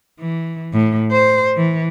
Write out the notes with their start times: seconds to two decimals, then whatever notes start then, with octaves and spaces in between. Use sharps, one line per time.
0.19 E3
0.73 A2
1.11 C5
1.56 E3